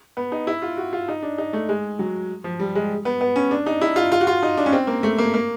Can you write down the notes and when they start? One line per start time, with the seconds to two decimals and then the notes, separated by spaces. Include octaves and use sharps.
0.17 B3
0.32 D#4
0.47 E4
0.62 F4
0.77 F#4
0.93 F4
1.08 D#4
1.22 D4
1.38 D#4
1.53 A3
1.69 G#3
1.99 F#3
2.44 F3
2.59 G3
2.75 G#3
3.05 B3
3.21 B3
3.36 C#4
3.51 D4
3.66 D#4
3.81 E4
3.96 F4
4.12 F4
4.21 F#4
4.27 F4
4.43 D#4
4.57 D4
4.66 C#4
4.72 C4
4.87 A#3
5.03 A3
5.18 A#3
5.34 A#3